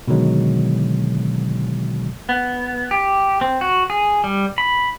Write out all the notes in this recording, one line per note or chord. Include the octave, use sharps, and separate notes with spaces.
B2 D3 D#3 F#3 G#3
B3
G4
C4
F#4
G#4
G3
B5